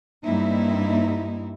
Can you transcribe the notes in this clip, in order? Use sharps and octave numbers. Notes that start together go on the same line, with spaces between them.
G2 G3 A#3 C4 D#4 E4